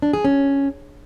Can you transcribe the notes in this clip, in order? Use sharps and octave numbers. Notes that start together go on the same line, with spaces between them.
D4
G#4
C#4